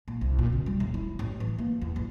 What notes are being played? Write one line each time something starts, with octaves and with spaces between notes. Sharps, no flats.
A#2
C2
A#2
C#3
G3
D#1
E4
A1
E3
A#3
E2
A1